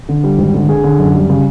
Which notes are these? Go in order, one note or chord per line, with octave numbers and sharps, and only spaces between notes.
D3
G3
G#1
D3
D3 G#4
D3
F#2
G3
C#3